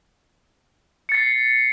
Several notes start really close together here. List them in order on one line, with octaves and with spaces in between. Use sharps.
C#7 A6 C7